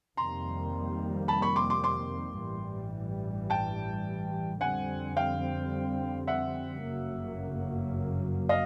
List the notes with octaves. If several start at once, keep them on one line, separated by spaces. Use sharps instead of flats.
F2 C3 D#3 G3 A#3 A#5 C6
A5 B5
B5 C#6
C6 D6
C6 D6
C6 D6
A1 G2 E3 G3
G5 A5
F2 D3 G3 C4 F#5 G#5
F5 G5
E5 F#5
G1 F#2 C#3 F#3 A#3
D#5 F5